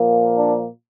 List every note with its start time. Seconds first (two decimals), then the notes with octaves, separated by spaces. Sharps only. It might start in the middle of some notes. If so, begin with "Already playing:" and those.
Already playing: A#2 F3 A#3
0.36 D4